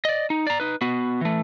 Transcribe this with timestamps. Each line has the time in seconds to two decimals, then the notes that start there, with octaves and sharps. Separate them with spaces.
0.05 D5 D#5
0.30 D#4
0.47 D5 A#5
0.60 D#4 B4
0.81 B3 F#4
1.21 E3 A3